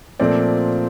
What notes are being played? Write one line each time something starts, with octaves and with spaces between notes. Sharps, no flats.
A#2 F3 A3 C4 D5